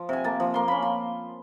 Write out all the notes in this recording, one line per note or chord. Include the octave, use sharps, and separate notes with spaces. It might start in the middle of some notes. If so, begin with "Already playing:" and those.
Already playing: F3
C3 G#5
A#3 A5
F3
A#3 C6
C#4 B5
C6